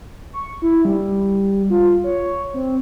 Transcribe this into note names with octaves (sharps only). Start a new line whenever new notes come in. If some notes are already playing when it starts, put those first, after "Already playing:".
C#6
E4
G3
F4
C#5
C4